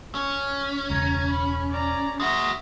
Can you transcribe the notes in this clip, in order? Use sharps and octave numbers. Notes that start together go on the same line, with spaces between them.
C#4
E1 C#2 A#5 G#6
B5
D5 A#5
G#3 F#4 E5 A#6